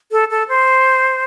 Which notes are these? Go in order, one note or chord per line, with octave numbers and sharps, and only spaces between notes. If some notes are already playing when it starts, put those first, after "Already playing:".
A4
A4
C5